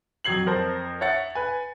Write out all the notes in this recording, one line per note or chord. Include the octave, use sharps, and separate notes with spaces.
F2 F#3 G#6 C7 F#7
F2 A#4 C5 A5
C#5 E5 F#5 A6 C#7
B4 G#5